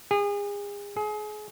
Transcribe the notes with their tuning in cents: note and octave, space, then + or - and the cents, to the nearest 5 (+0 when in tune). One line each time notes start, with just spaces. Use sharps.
G#4 -35
G#4 +30